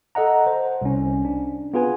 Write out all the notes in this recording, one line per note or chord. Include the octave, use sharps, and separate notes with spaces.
A4 D#5 F#5 A#5
C5
C2 C#4
D4
B3 F4 G#4 B4 G#5